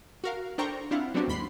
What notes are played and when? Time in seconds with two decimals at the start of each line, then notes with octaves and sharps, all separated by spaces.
0.24 F#4 A#4 F5
0.58 D4 A4 C5 G5 A#5 C#6
0.91 C4 D4 E4 F4 F5 F#5
1.14 F#3 B3 C4 D4 F#4 G4
1.28 D#2 G#2 B5 C6 C7